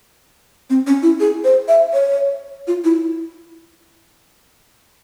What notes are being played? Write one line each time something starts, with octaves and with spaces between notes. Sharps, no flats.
C4
C#4
E4
G#4
C5
E5
C#5
F4
E4